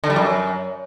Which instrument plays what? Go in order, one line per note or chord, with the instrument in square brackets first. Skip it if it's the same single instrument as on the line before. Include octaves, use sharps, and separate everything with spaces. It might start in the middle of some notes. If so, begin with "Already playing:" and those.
[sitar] D3
G3
F#2